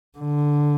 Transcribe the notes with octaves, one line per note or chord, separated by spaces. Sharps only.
D3